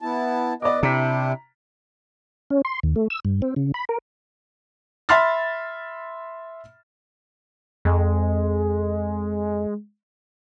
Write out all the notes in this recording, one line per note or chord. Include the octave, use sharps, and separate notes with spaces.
B3 E4 A5
B3 B4 D5 D#5 D6
C3 D4 E4 G4 A#5 B6
C#4
C6
D#2
A3
E6
G2
C4
C#3
B5
A#4
E5 B5 C6 F6 A6
F2 G#3